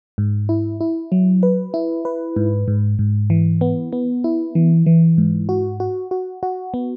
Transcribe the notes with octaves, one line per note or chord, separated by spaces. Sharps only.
G#2
E4
E4
F#3
B4
E4
B4
G#2
G#2
G#2
E3
B3
B3
E4
E3
E3
G#2
F#4
F#4
F#4
F#4
B3